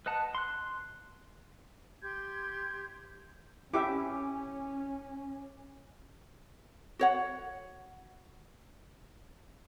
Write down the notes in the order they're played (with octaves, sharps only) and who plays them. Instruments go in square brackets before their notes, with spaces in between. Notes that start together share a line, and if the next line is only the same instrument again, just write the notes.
[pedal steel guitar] B4 D#5 F#5 A5
C6 F#6
[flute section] G4 C6 G6 G#6
[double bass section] C#4 [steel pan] E4 G4 E5 [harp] D6
[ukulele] F#4 C#5 F#5